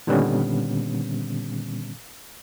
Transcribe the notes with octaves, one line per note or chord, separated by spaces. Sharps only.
A#2 D3 D#3 G3 B3 C#4